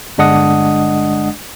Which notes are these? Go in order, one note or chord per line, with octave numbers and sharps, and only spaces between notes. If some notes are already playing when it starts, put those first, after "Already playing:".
G1 G#3 D4 D#5 F#5 D#6